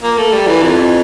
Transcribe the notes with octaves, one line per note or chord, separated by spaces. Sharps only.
A#3
A3
G3
E3
F2